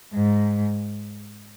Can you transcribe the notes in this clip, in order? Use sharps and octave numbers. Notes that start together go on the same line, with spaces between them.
G#2